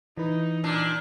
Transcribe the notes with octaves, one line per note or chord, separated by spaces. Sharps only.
E3 D#4 B4
A#2 D4